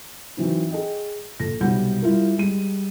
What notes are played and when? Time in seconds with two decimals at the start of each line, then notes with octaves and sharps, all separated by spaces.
0.37 E3 F#3 C4 D#4
0.71 G#4 D#5 G5
1.40 A#1 A4 A#6
1.60 B1 C3 G3 F#5 B5 G6
2.02 G3 E4 F4 A#4
2.38 G3 G#3 D#7